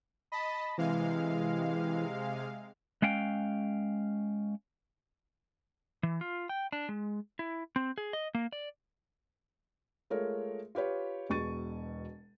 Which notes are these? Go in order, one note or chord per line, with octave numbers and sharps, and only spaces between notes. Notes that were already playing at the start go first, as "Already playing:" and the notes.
D#5 A5 B5
C3 E3 G#3 F5
G#3 C#4 F5 G5
E3
F4
G5
D4
G#3
E4
C4
G#4
D#5
A#3
D5
G#3 A3 F4 A#4 C#5
F4 G4 B4 C#5
E1 B2 G#4 C#6 A6 D#7